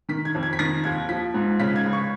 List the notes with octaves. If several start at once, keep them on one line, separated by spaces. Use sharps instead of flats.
D#3 B6
G#6
F2
G#6
B6
D#3 A#6
D#2 G#6
F3 B6
G#2
C#3 B6
G#6
C#2
C#6